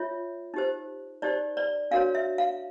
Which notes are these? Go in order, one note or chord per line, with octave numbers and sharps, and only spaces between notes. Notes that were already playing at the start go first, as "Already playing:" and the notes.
Already playing: F4 C#5 E5
D#4 G4 C5
D#4 G4 C5 D5
D5
D4 F#4 A#4 C#5 F5
E5
F5